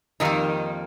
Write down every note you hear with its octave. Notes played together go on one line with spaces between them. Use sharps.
F2 D#3 G3 A#3 D#4